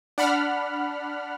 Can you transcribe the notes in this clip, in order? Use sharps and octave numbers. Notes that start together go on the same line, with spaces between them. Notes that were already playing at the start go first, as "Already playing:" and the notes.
D4 F#5 B5 F6